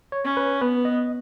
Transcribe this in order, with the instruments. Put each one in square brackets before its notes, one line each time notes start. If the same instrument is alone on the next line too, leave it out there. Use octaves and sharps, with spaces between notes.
[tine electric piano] C#5
[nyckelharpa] C#4
[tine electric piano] B4
[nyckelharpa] B3 [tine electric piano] B4
[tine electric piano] D#5